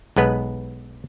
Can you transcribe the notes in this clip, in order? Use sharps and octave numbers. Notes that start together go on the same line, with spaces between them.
B1 G#3 B3 B4